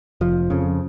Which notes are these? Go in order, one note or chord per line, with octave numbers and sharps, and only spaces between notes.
F1 F3
F2 C#3